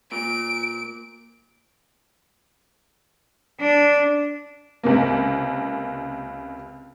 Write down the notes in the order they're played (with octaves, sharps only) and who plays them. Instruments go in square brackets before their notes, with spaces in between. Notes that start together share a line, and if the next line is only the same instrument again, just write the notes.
[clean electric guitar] A#2 [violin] D7
[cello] D4
[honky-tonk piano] C#2 C3 A#3